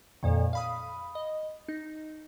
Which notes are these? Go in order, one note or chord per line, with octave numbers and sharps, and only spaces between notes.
F2 A#2 D#3
F5 B5 D#6
D#5
D#4